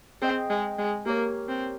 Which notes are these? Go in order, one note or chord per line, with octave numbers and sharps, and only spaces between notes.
C4 G#4 D#5 G5
G#3
G#3
A#3 G4 A#4 C#5
C4